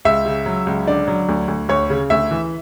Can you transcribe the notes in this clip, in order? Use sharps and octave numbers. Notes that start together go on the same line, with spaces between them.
C#2 E5
C#3
F#3
C#2
D3 D5
F#3
D2
D2
D2 C#5
C#3
D2 E5
E3